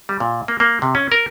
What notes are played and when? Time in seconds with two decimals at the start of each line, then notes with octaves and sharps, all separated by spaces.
0.09 G3
0.20 A#2
0.48 A#3
0.60 A#3
0.82 C3
0.95 C#4
1.12 A#4